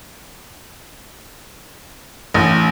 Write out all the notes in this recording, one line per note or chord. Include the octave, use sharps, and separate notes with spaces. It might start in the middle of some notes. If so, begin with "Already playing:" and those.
A1